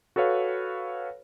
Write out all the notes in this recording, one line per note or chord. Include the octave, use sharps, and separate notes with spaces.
F#4 A4 B4 C#5 F5